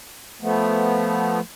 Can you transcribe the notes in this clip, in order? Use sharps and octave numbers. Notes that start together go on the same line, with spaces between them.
F3 A3 B3